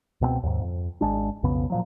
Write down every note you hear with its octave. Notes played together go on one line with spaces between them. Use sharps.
C#2 B2 F#3 C4
D#2 G#2
F2
G#1 G#3 D4
B1 F2 C#3 B3
A#2 F3 F#3